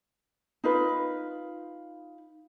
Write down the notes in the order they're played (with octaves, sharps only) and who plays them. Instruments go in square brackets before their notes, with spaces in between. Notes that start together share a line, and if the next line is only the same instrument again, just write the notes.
[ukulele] D#4 F4 B4